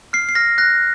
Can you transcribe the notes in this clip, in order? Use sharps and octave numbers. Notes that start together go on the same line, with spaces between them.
F6 C7
C7
F6 A#6
F#6 A#6